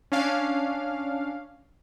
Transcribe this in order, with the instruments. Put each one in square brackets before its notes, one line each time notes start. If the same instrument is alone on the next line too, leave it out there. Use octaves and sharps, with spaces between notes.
[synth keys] C#4 D4 F5